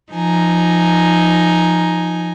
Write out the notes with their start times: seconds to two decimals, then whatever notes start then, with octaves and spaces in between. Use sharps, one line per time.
0.12 F3 D#4 G#5 A#5